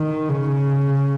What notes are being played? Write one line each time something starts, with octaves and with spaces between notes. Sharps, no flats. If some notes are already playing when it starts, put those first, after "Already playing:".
Already playing: D#3
C#3